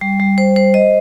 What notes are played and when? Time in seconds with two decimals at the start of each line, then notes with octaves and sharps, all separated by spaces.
0.01 G3
0.20 G3
0.38 C5
0.56 C5
0.74 D#5